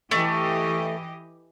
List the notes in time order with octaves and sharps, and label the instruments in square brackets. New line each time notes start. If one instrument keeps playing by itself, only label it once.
[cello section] E3 G4 D#5 [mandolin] A3